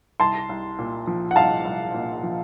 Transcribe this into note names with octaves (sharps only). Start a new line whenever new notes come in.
C2 A5 C6
C2
A#2
F3
F#5
C2 F5 A5
C2
A#2
F3